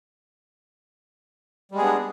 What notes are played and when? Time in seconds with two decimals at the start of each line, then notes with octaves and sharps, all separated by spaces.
1.71 G3
1.75 G#3
1.78 G#4
1.81 B3
1.84 D4